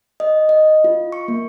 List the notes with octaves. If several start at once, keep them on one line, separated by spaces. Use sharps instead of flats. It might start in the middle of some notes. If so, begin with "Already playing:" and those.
D#5
D#5
F4
C#6
A#3